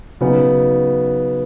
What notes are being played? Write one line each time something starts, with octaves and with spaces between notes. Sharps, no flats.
C#3 F#3 B3 D#4